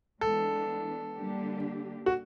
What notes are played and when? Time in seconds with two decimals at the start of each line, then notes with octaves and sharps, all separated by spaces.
0.21 E3 G#3 B3 D4 A4
1.16 D3 G3 A#3 D4 G4
2.06 F#4